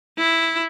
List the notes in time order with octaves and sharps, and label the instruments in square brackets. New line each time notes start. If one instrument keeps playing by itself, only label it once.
[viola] E4